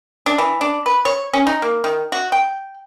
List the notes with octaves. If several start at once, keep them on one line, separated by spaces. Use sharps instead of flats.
D4
E3
D4
B4
C#5
C#4
D#4
A#3
D#3
F#4
G5